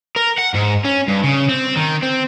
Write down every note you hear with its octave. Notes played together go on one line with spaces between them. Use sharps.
A#4
F#5
G#2
C#4
G2
C#3
C4
D#3
C4